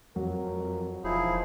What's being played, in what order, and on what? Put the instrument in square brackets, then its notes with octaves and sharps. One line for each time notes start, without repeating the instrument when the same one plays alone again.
[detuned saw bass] F2 [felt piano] F#3 [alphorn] A#4
[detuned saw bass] E1 [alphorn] F3 [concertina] D#4 E4 G#4